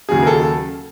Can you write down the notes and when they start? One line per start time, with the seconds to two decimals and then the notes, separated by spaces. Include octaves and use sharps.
0.09 D#2 C#3 F#3 G#4
0.23 A#4
0.27 A4